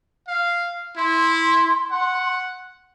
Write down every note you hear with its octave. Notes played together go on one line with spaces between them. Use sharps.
F5
E4 C6
F#5